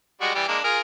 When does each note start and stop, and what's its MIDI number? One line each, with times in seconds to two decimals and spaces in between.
0.21 0.31 55
0.21 0.31 56
0.21 0.31 66
0.35 0.47 52
0.35 0.47 55
0.35 0.47 67
0.48 0.59 56
0.48 0.59 58
0.48 0.59 62
0.64 0.81 65
0.64 0.81 68
0.64 0.81 70